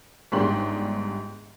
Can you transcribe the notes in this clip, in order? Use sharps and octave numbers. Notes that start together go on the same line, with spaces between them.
G1 G#2 D4 G4 C6 F#7